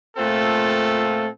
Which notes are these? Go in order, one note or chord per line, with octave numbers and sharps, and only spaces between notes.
A#2 A3 C4 F4 A4